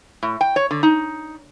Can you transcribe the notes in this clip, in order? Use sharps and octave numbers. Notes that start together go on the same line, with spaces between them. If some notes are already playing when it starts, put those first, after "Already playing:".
A2
G5
C#5
D3
D#4